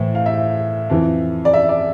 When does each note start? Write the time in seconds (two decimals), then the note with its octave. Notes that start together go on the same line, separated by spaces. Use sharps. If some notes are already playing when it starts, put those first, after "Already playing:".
Already playing: A2 E3 C5
0.15 F5
0.26 E5
0.89 F2 E3
1.45 D5
1.53 E5
1.69 D5